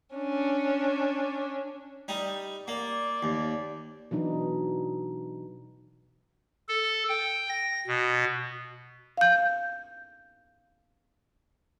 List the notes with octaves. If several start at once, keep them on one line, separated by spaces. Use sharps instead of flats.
C#4 D4
G3 D#4
A#3 D5
D#2
B2 E3 F#3 D4 D#4
A4
G5
A#6
B2
F5 G6